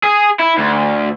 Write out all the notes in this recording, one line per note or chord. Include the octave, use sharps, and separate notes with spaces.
G#4
E4
D2